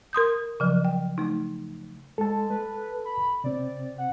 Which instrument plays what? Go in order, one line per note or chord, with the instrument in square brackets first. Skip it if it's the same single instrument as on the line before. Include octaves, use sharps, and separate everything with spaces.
[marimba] A#4 C6 D#6 G6
C#3 F3 F#3
G5
A3 D#4
[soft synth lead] G#3 [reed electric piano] A4 A5
[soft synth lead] B4
B5
[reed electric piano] C3 C4 [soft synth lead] D5
[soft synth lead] F#5